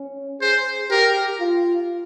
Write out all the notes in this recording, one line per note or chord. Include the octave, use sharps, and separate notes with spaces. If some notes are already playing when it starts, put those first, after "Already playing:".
Already playing: C#4
G#4 C5
G4 A#4
F4